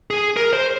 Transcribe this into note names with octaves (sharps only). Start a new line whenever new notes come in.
G#4
A#4
C5